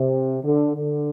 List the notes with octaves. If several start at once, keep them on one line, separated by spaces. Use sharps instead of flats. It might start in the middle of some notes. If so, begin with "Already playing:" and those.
Already playing: C3
D3
D3